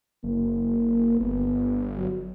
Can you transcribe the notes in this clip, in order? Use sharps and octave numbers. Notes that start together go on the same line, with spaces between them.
F#1 A#3
G1 B3
F#3